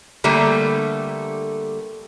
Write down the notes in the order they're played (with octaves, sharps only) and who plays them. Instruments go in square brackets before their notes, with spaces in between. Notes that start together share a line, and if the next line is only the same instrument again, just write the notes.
[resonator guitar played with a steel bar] D3 G3 A3 A#3